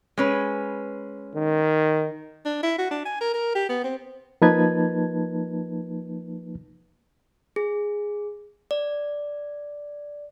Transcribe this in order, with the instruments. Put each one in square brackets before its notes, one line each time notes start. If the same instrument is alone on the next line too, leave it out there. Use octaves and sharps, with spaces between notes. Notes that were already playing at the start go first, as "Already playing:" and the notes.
[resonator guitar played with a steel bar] G#3 C#4 B4
[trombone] D#3
[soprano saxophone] D4
E4
F#4
D4
G#5
A#4
A#4
G4
B3
C4
[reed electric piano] F3 A#3 D#4 B4 A5 G#6
[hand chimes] G#4
D5